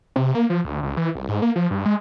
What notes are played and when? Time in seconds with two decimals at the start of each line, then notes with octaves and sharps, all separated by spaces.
0.16 C3
0.35 A#3
0.50 F3
0.65 D2
0.83 C#2
0.97 E3
1.15 C2
1.29 G#2
1.42 A#3
1.56 F3
1.71 G2
1.86 G#3